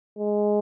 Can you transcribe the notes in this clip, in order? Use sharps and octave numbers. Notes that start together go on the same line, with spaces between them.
G#3